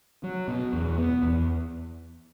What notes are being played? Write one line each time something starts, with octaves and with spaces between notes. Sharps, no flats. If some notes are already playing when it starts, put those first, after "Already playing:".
F#3
B2
E2
B3
E2